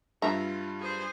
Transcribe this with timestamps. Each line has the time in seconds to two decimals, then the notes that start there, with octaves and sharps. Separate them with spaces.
0.22 G2 G3 F4 E5 A#5
0.80 G#4 C5